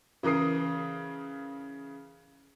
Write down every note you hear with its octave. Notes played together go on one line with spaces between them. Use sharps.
C#3 E3 A#4 D#6 C7